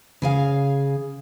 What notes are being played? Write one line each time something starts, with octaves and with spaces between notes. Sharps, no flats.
C#3 G#4 F5